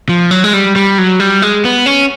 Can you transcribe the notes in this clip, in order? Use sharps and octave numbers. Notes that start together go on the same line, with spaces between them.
F3
F#3
G#3
G3
G3
F#3
G3
G#3
B3
C#4